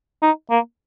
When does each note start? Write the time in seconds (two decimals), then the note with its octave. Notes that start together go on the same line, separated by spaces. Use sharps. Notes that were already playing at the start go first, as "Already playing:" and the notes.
0.22 D#4
0.51 A#3